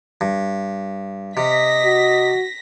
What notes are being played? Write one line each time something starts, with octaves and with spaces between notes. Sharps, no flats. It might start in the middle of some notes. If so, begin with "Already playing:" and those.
G2
C3 D#5 A#6 B6
F#4